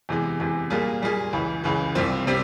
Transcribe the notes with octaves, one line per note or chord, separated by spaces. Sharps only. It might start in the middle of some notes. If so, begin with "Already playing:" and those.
E2 C3 E3 G#3
E2 C3 E3 G#3
A#2 G3 A#3 F4 G#4
A#2 G3 A#3 F4 G#4
C#2 C#3 E3
C#2 C#3 E3
C2 C3 G3 C4 F4
C3 G3 C4